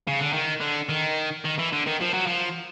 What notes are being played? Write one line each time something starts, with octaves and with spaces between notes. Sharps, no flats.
C#3
D3
D#3
D3
D#3
D#3
E3
D3
D#3
F3
F#3
F3